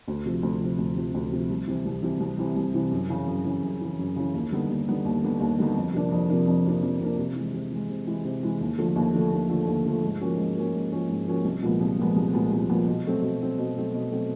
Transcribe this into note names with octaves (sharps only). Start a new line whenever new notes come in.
D2
C3 F3
D2
C3 F3
D2
C3 F3
D2
C3 F3
C2
C3 E3
C2
C3 E3
C2
C3 E3
C2
C3 E3
F#2
C#3 E3
F#2
C#3 E3
F#2
C#3 E3
F#2
C#3 E3
D#2
D3 G3 B3 D#4
D#2
D3 G3 B3 D#4
D#2
D3 G3 B3 D#4
D#2
D3 G3 B3 D#4
F2
C3 F3 A#3 D4
F2
C3 F3 A#3 D4
F2
C3 F3 A#3 D4
F2
C3 F3 A#3 D4
C3
E3 G#3
C3
E3 G#3
C3
E3 G#3
C3
E3 G#3
D#2
D3 F3 A3
D#2
D3 F3 A3
D#2
D3 F3 A3
D#2
D3 F3 A3
G#2
F3 A#3 C#4 F#4
G#2
F3 A#3 C#4 F#4
G#2
F3 A#3 C#4 F#4
G#2
F3 A#3 C#4 F#4
C2
A#2 F3 G#3 B3
C2
A#2 F3 G#3 B3
C2
A#2 F3 G#3 B3
C2
A#2 F3 G#3 B3
B2
F#3 A3 C4
B2
F#3 A3 C4
B2
F#3 A3 C4
B2
F#3 A3 C4